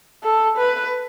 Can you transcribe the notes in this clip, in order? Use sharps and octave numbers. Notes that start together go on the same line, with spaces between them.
A4
B4